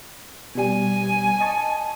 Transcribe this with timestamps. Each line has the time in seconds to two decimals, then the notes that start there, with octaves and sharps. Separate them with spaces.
0.55 B2 G3 G#5
1.41 D#5 A5 C#6